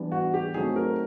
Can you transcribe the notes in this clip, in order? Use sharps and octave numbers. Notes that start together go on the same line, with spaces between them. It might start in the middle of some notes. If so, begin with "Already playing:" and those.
Already playing: E3 G3 B3 D4
F#4
G4
D#3 F#3 A3 C4 G#4
A#4